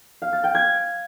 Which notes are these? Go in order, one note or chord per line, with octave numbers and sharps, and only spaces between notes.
F5
A6
G5
G#6